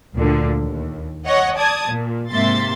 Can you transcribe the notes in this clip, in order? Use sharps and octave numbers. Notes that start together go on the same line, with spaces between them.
D2 A#2 D3
D#2
C#5 D#5 F#5 C#6
D5 A5 D#6 G#6
A#2
G#2 C3 A#3 E5 C6 A6